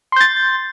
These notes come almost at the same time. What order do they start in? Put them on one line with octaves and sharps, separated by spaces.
C6 G6 A6